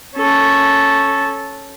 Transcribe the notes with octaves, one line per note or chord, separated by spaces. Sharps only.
C#4 A4